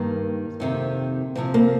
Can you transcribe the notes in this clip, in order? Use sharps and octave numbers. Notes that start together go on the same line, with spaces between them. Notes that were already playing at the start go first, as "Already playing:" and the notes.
Already playing: G2 D#3 A#3
F2 C3 D#3
F2 C3 F3 C4
A#3